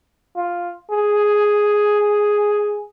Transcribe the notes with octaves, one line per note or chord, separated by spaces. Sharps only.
F4
G#4